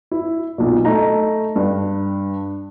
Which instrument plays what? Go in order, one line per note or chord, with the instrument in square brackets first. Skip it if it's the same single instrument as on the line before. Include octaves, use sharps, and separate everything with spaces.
[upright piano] E4
B1 A#2
A3 D#4 A#5
G2